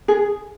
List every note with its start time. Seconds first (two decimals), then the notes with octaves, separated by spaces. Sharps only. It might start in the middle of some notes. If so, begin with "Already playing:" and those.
0.08 G#4